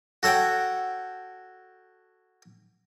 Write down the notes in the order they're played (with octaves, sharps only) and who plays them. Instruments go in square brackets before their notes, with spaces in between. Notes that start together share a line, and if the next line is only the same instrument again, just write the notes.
[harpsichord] F#4 A4 C#5 F#5 G5